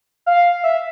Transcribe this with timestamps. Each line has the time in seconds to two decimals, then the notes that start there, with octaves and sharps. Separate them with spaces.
0.26 F5
0.63 E5